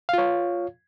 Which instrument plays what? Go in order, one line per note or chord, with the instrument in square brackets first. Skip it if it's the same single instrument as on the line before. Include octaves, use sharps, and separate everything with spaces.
[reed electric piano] F5
F4
C#5